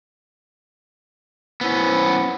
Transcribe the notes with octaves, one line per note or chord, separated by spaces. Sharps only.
B3 C#4 E4 C5 B5